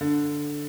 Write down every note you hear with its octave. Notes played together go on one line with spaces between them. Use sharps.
D3